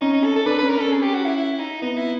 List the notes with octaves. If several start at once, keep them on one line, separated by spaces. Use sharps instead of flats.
C#4 D#4
D#4
A4
A4
D4 B4
C#4 B4
A#4
C#4 A4
G#4
G4
F#4
E4
E4
D#4
B3 D#4
E4